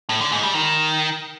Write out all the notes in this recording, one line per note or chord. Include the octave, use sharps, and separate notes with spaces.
A2
D3
G#2
G3
D#3